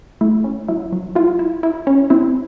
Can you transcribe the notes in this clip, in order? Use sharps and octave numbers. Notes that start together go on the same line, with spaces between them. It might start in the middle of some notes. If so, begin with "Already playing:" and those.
A3 E4
C#4
F#3 E4
F#3
E4 F4
E4
E4
C#4
C4 E4